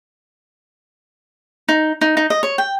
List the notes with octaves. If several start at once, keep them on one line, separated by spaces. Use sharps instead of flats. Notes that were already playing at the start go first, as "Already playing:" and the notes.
D#4
D#4
D#4
D#5
C#5
G5